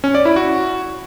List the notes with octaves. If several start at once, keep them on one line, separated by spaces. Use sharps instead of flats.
C#4
D5
E4
F#4